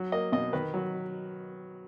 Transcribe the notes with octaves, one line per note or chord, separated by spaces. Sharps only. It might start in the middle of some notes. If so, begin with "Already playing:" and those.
Already playing: F#3
A#3 D#5
B2 D#5
D#3 B4
F#3